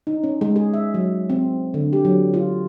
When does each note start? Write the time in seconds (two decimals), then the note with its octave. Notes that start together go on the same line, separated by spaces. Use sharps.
0.07 D#4
0.24 C#4
0.41 G#3
0.56 G#4
0.74 E5
0.94 F#3
1.30 C4
1.74 D3
1.93 G4
2.05 F#3
2.34 F4